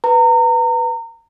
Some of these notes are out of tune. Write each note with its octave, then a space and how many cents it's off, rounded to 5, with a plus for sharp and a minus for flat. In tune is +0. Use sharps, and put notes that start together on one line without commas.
B4 +0 A#5 -30